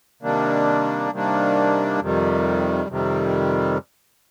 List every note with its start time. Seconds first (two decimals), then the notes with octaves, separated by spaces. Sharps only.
0.22 C3 D#3 G3 A#3 D4
1.12 C3 D#3 G3 A#3 D4
2.00 F2 C3 D#3 G3
2.89 F2 C3 D#3 G3